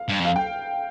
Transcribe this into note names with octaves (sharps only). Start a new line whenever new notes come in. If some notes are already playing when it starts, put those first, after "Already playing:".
Already playing: F5
G2
F2
F5
G5